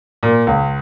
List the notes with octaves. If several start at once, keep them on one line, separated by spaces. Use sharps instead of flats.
A#2
C#2